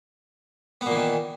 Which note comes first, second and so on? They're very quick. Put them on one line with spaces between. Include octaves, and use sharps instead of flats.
B3 A#2 E3 D#3